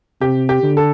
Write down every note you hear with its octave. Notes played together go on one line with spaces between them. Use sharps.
C3 G4
G4
D3
A4